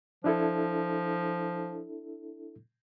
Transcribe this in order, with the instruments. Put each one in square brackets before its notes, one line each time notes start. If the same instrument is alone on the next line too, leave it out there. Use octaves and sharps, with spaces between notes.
[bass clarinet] F3 [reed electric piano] D4 E4 A4